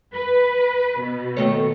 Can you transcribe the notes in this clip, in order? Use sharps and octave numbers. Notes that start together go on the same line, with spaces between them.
B4
B2
D#3 A3 C#5